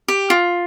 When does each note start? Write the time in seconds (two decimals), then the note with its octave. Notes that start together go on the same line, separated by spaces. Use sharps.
0.08 G4
0.30 F4